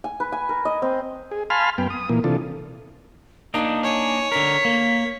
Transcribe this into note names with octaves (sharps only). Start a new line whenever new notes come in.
G#5
B4
G#5
A#4
D#5
C4
G#4
F5 G#5 A5 B5 C6 F6
F#2 B3 G5
D#6
A#2 E3 A#3
C3 E3 D4 F4 A4
A#3 D4 D#4 D#6
C#5 G#5
D3 A#4 B6
A#3